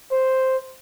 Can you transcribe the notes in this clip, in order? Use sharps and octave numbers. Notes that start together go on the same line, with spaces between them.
C5